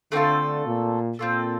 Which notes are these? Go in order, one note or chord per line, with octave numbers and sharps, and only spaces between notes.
D3 A3 C4 F4 A4
A#2
A#2 C4 F4 A4